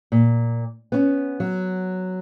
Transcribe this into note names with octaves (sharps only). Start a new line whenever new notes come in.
A#2
B3 C#4
F#3